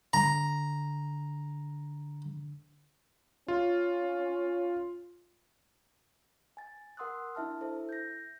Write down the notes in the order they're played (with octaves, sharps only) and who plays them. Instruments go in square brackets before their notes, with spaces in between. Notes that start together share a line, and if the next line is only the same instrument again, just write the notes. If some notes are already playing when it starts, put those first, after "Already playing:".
[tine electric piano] D3 [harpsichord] A#5
[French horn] C#4 [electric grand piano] F4
[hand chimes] G#5 A6
A#4 F#5 C6 D#6 E6 F#6
D4 E4 E5 A5 F6
E4 A4 C5 E5
G6 A#6